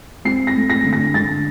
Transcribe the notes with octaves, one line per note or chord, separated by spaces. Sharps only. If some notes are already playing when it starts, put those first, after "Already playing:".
C4 C7
A#6
A3
A#6
D3
A#6
D3 A6